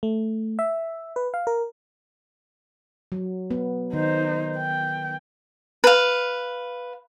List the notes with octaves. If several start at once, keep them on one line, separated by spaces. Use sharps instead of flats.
A3
E5
B4
F5
A#4
F#3
B3
D#3 D#4 C5
G5
B4 F5